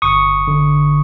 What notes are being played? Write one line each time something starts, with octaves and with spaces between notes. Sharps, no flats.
G1 C#6 D#6
D3